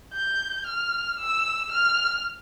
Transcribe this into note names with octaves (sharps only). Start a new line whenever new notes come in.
G6
F6
E6
F6